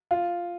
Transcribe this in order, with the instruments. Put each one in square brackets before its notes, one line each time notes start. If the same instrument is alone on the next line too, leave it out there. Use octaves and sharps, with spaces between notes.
[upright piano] F4